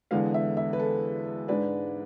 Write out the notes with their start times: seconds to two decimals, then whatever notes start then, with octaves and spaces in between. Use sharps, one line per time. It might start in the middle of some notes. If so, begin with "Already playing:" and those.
0.11 E2 D3 G#3 B3 F5
0.34 E5
0.57 E5
0.73 B4
0.80 A4
1.48 G#2 G#3 D4 B4